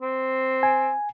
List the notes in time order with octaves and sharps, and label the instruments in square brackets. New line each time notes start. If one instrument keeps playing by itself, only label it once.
[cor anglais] C4
[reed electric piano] G#5